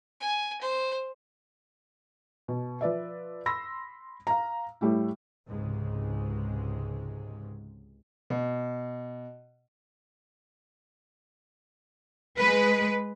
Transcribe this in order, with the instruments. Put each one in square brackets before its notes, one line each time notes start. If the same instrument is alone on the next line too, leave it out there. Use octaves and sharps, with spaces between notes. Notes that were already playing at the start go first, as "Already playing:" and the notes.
[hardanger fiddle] G#5
C5
[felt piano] B2
F3 B4 D5 E5
B5 C6 E6 A#6
F5 A#5
A2 G3 A3 E4
[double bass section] C#2 G#2 C3 G#3
[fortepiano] B2
[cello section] G#3 B4